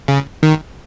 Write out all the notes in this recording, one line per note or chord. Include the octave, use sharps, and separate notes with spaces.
C#3
D#3